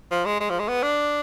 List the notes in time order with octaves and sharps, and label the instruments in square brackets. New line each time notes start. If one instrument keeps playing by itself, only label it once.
[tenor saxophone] F3
G#3
G#3
F3
G#3
B3
D4